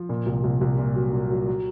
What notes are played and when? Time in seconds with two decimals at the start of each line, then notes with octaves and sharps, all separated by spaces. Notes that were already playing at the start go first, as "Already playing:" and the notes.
Already playing: F3
0.09 A#2
0.26 C2
0.44 C2
0.61 C2
0.78 A#2
0.96 F#3
1.13 A#2
1.30 F#3
1.48 F#3